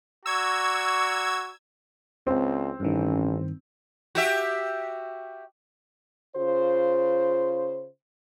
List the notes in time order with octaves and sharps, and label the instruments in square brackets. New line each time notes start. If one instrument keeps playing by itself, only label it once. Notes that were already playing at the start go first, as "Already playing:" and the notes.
[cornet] F#4 [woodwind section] D5 A#5 C#6 [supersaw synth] E6 G#6
[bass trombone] C#2 [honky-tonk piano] C4
[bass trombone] A1 [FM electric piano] G2 D#3 [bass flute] C#4
[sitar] F#4 G4 E5
[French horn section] C#3 F4 C5